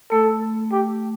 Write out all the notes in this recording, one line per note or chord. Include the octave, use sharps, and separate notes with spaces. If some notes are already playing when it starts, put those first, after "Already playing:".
A3 A4
G4